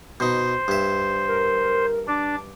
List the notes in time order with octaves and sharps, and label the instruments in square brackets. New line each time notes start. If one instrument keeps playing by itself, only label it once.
[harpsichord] B2 D#4 [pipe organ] C5
[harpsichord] G2 E5
[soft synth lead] A#4
[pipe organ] D4 [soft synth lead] D6